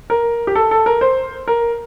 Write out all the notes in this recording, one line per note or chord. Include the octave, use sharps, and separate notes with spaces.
A#4
G4
A4
A4
A#4
C5
A#4